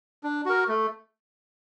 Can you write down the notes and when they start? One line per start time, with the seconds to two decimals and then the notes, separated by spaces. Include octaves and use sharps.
0.23 D4
0.46 F#4 A#4
0.68 A3